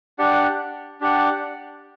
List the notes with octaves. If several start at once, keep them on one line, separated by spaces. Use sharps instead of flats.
D4 G4 D5 F#5
D4 G4 D5 F#5